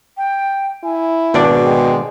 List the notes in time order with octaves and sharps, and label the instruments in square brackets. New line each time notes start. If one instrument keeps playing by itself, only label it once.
[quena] G5
[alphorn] E4 [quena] G#5
[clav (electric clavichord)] G#1 D4 D5 [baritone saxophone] B2
[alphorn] G#3 [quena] G5